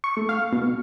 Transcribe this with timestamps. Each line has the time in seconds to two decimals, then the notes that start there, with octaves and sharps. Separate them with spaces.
0.04 C#6
0.17 A3
0.29 F5
0.53 B2